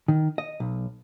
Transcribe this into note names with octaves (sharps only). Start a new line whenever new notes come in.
D#3
D#5
B1